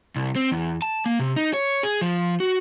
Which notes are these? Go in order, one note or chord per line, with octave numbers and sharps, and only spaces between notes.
C2
C4
E2
A5
A#3
C3
D#4
C#5
G#4
F3
F#4